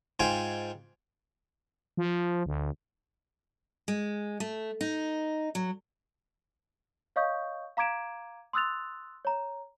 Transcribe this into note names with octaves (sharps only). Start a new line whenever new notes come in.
G#2 F4 G5 G#5
F3
D2
G#3
A3
D#4
F#3
C#5 D#5 F5 C#6 D#6 G6
F5 A#5 D6 G#6 D7 E7
C6 D#6 E6 F#6 A6 F7
C#5 A#5